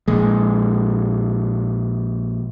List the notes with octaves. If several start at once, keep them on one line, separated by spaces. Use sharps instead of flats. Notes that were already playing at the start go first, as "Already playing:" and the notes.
A#1 G#3